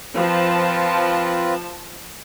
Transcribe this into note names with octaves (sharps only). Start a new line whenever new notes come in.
F3 C4 F4 B4 A5